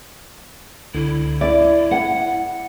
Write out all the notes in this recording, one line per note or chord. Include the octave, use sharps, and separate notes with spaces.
C#2 D3 E4
D5 E5
F#5